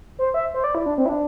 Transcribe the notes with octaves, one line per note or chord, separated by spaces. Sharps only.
C5
E5
C5
D5
E4
D4
C4
E4
D4